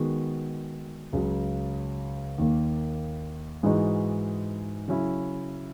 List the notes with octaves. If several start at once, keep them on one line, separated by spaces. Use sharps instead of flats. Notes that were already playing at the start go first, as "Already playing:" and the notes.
Already playing: D#3 G#3 B3 F#4
C#2 C#3 F#3
D#2 D#3 A#3
G#2 E3 G#3 D#4 F#4
C#3 F#3 C#4 E4